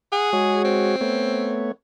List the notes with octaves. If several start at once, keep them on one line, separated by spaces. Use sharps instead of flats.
G#4 F#5
G#3 F#4 C#5
C4
A3 B3 C#5